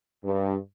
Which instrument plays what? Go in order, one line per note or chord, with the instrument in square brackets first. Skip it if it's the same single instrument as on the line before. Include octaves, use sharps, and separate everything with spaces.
[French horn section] G2